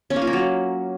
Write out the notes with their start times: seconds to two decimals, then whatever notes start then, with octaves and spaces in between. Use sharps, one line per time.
0.10 C#4
0.16 A#3
0.22 F4
0.27 A#3
0.33 F#3